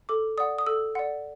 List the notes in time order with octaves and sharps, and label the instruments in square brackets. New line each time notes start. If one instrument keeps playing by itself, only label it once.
[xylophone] A4 D6
D5 F#5 D#6
D#6
A4 E6
D5 F#5